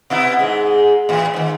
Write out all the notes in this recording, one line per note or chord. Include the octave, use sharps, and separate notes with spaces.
B2 B3 E4
G#2 G#3
A2 E3
G#2 D#3